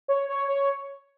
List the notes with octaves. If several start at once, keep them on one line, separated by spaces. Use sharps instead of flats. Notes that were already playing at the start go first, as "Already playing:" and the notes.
C#5
C#5
C#5